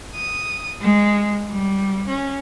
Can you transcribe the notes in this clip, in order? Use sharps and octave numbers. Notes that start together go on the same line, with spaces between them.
D#6
G#3
G3
C#4